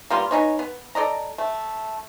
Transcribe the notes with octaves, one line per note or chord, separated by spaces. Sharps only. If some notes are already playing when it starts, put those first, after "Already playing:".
G3 A#3 B3 F4
B3 C#4 D#4 C#5
B3
A4 D5 D#5 A#5
A3